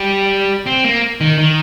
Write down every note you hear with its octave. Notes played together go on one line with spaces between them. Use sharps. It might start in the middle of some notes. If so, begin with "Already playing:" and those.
Already playing: G3
C4
A#3
D#3
D#3